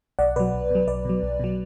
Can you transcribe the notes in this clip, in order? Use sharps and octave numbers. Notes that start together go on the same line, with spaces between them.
B1 D5 F#5
B2 F#3 B4 D5
B1
B2 F#3
B1 B4 D5
B2 F#3
B1
B2 F#3